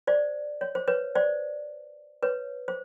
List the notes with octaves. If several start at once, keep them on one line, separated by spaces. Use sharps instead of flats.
C5 D5
C#5
C5
B4 C#5
C5 D5
B4 C#5
C5